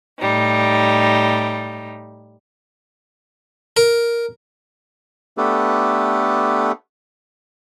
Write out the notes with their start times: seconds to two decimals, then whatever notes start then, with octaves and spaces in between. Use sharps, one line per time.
0.20 A2 G3 D#4
3.77 A#4
5.38 A3 B3 D4 G4 A4 B4